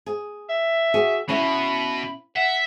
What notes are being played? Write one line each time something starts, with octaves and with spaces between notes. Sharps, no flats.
G#4
E5
F#4 G#4
B2 C#4 E4 B5
E5 F#5